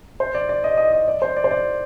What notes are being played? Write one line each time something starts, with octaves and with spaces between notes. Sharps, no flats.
C5
D5
D5
D#5
D#5
D#5
D5
C5
D5
C5
D5